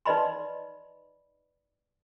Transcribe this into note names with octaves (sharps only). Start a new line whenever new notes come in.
D#4 B4 D5 D#5 B5 C6